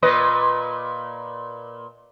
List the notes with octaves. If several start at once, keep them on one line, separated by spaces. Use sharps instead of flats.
A#2 B4 D#5